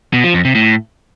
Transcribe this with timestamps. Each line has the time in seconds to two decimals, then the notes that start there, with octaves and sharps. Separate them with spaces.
0.13 B2
0.24 F3
0.34 F2
0.45 C3
0.55 A2